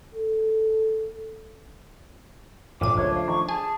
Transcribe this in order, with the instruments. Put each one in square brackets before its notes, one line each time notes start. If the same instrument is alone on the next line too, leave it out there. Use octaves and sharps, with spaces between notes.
[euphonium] A4
[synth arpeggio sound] G2 A#2 D#7 [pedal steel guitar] F3 A3 D4 [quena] D6
[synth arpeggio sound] C#2 [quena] C#5
[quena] F5
[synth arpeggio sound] D#3 [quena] C#6
[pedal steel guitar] G#4 [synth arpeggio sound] G#5 [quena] A5